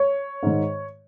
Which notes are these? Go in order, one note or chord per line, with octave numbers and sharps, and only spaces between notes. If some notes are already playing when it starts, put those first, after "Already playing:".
Already playing: C#5
G#2 D#3